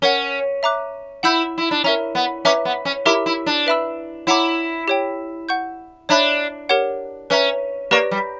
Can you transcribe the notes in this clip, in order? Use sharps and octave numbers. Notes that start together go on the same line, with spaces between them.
C#4 A#4 C#5 F#5
E5 A#5 D6 F#6
E4 F#5 B5 E6 G6
E4
D4
C#4 A#4 E5 A#5
B3
C#4 B4 E5 A#5 D6
B3
C#4
E4 G4 A#4 E5 A#5 D6
E4
D4
B4 E5 B5 E6
E4 C#5 F#5 A#5 D6
G4 C#5 G5
F#5 C#6 G6
D4 C#5 E5 B5 F#6
G4 A#4 C#5 F#5
C#4 B4 E5 A#5
A#3 G4 B4 D5 A#5 C#6
G3